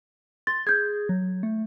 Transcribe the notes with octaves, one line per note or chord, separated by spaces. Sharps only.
C6 A6
G#4 G6 G#6
F#3
A3